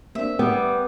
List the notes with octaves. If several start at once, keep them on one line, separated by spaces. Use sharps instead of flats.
A#3 C4 D4 E5
G3 B3 G5